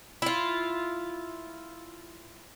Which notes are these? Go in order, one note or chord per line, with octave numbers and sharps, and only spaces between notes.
E4 F4